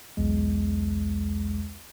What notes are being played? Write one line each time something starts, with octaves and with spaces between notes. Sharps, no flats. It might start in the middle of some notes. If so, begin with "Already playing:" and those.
B1 E2 G#3